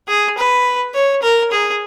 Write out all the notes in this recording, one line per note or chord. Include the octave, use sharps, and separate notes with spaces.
G#4
B4
C#5
A#4
G#4